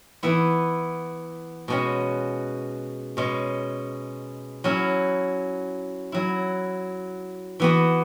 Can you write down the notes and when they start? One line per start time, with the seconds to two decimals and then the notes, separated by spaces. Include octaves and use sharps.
0.23 E3 B3 E4
1.68 B2 G#3 C#4 F#4
3.17 B2 G#3 C#4
4.64 F#3 C#4 E4
6.12 F#3 E4
7.60 E3 B3 F#4